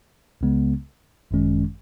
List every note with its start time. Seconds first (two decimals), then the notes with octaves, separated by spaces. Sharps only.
0.41 C#2 C#3 G#3 B3
1.31 G#1 F#2 D#3 G#3 C#4